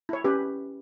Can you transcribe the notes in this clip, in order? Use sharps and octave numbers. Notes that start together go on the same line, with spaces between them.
E4 C#5
C#4 G4 B4